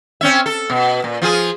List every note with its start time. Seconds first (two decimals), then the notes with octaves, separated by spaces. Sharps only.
0.21 C4 C#4 E5
0.46 A4
0.70 B2
1.04 A#2
1.22 F3 F4 G#4